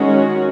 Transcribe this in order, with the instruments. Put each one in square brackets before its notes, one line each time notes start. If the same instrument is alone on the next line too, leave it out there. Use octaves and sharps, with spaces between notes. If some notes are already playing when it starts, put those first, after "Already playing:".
Already playing: [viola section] D#3 G#3 C#4 F#4